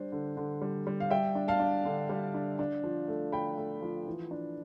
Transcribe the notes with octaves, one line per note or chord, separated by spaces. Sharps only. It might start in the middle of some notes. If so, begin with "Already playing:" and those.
Already playing: G3 D4 C5
D3
D3
G3
G3
F5
G3 E5 G5
D4
F5 A5
D4
D3
G3
D4
D4
F3
A3
A3 G5 B5
A3
F3
E3
D4